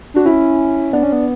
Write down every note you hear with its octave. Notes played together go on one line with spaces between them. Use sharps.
D4 F#4
C#4 E4
B3 D4
C#4
B3